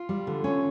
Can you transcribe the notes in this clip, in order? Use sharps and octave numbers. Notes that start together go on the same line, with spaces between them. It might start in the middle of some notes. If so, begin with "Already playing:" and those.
Already playing: F4
G3
D3
C#4